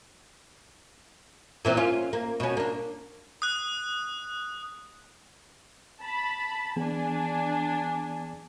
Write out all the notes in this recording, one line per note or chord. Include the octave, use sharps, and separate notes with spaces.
A#2 E3 C4
C#4 F4
A#3
B2 C#4
A#3 D4
D#6 F#6
A5 B5
E3 B3 D4 G#4 G#5